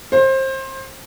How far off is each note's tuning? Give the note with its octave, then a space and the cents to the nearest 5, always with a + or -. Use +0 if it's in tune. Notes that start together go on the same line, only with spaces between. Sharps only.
C5 +25